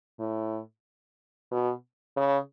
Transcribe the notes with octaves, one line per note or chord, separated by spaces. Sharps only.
A2
B2
C#3